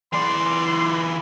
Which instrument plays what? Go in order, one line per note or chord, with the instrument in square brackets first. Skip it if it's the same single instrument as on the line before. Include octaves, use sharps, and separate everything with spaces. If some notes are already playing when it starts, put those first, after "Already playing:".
[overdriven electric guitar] E3 D5 [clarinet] C6